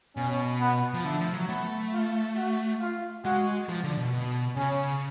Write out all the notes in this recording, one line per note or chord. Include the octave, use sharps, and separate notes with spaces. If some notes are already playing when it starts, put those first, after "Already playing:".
B2 C#4
B3
F3
D3 A3
F3
F#3
A3 B3
F4
F#4
F4
G#3 F#4
F3
D3
B2
B2
C#3 C#4